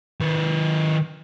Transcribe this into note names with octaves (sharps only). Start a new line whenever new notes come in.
D#3 B4